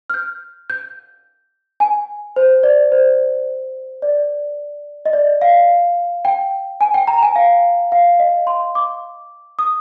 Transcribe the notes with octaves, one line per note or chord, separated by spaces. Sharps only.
F6
G6
G6
G#5
C5
D5
C5
D5
D#5
D5
F5
G5
G#5
G5
A#5
G#5
F5
F5
D#5
C6
D6
D#6